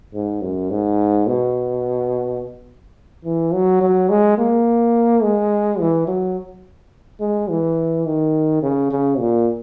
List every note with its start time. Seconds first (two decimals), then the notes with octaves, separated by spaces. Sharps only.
0.14 G#2
0.42 F#2
0.70 G#2
1.27 B2
3.25 E3
3.54 F#3
3.82 F#3
4.10 G#3
4.38 A#3
5.23 G#3
5.80 E3
6.08 F#3
7.21 G#3
7.50 E3
8.06 D#3
8.63 C#3
8.91 C#3
9.19 A#2